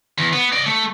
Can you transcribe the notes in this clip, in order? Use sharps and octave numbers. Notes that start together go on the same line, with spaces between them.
E2
B3
D5 D#5
A3